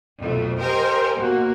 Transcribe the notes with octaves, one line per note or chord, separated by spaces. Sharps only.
B1 F2 A3
G4 A#4 C5 D#5 G5 G#5
B2 A#3 F#4